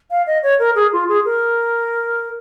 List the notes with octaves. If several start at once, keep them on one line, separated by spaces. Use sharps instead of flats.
F5
D#5
C#5
A#4
G#4
F4
G#4
A#4